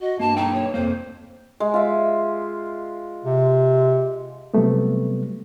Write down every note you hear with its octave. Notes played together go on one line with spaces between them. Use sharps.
F#4 D#5
G2 A#3 A5
B1 A#3 D#4 G5
C#5
F2 C3 A#3 C5
G#3
F4 E5
C3
C3 F#3 G3 A3 B3